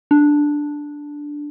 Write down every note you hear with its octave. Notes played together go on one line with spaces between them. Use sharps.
D4